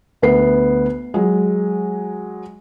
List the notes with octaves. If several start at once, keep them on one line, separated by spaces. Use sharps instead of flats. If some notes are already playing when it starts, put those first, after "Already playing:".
D2 B3 B4 C7
F#3 G#3